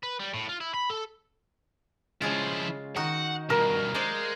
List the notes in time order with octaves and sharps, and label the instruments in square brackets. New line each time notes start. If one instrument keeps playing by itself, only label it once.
[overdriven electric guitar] B4
G3
A2
F4
E4
B5
A4
[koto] C#3 G#3 F4 [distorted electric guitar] F3 E4
[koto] D#3 D#4 F#4 [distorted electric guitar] F#5
[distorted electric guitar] G2 B2 [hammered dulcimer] A#4
[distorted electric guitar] G#3 [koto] C5 D5 F5